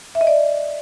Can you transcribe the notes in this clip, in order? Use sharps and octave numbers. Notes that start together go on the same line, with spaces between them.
E5
D#5
D5